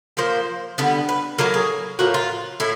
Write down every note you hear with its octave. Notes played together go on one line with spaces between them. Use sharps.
A#2 F3 A#3 C5
D3 G3 B3
B4
A2 F#3 A#3 A#4
G#4
A2 F3 A#3 F#4
F4
A2 E4